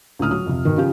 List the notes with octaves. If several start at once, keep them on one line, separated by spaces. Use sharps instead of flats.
C#2 A2 D3 D#6 F6
F#3 D#6
F2 C3
B2 D#3
C#3 F3 G4